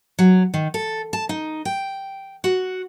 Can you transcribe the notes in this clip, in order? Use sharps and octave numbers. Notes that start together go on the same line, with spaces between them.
F#3
D#3
A4
A5
D#4
G5
F#4